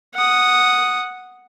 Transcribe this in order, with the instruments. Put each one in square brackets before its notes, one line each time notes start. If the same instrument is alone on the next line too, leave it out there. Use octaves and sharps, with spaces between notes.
[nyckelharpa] F#5 D#6